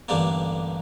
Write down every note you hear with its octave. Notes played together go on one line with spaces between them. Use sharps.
A1 G2 D3 G3 A#3 D5